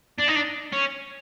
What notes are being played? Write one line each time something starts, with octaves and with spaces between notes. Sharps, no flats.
D4
D#4
D4
C#4